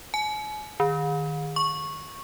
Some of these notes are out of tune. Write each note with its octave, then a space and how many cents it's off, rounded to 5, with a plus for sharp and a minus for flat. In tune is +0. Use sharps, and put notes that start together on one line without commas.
G#5 +40
D#3 -15
C#6 -10